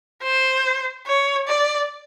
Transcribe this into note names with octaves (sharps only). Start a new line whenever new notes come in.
C5
C#5
D5